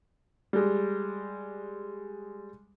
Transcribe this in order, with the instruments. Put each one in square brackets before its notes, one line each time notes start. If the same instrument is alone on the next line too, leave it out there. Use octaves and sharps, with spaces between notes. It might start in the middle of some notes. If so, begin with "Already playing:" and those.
[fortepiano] G3 G#3